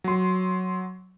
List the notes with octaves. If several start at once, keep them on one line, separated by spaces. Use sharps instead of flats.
F#3 C6